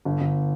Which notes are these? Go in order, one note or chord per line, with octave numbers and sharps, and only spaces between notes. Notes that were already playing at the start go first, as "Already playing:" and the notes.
G1
G1